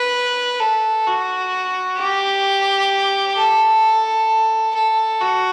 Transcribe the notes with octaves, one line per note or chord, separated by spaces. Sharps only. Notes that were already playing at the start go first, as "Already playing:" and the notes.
Already playing: B4
A4
F#4
G4
A4
A4
F#4